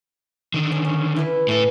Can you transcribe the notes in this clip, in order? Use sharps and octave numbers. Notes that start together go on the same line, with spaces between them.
D3 D#3
C#4
C#4
E4 B4
A2 E3 A4 A5